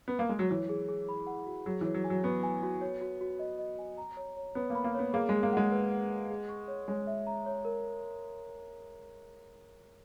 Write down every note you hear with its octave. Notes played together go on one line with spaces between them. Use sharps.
B3
A#3
G#3
F#3
E3 C#5
G#4
G#4
B5
F#5
F#4
F#3 G#4
E3 C#5
F#3
G#5
F#3
B3 C#6
G#5
F#4
C#5
F#4
F#4
D#5
D#5
G#5
A#5
C#5
C#5
B3 C#5
A#3
B5
A#3
B3 C#5
A#3 G#4
G#3 G#4
A#3
G#3 F#5
B4
F#5
F#5
G#4
C#6
C#5
G#3 C#5
E5
A#5
C#5
A#4